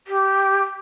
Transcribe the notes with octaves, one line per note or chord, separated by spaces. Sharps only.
G4